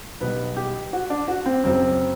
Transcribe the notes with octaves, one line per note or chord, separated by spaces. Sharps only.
B1 B2 G3 B4
G4
F#4
D4
F#4
C4
F#1 F#2 F#3 C4